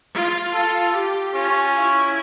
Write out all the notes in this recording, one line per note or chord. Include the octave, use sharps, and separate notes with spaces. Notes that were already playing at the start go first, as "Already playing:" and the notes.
F4
F4 A4
G4
C#4 F4
E4